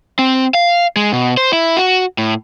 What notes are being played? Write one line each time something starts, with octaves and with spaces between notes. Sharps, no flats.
C4
F5
G#3
B2
C5
E4
F#4
A2